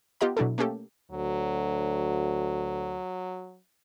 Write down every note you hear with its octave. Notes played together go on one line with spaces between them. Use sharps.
B3 F4 G4 D#5 F#5 A#5
B2 F#3 D4 E4 A4
A3 A#3 C#4 G4 A4
D2 F#3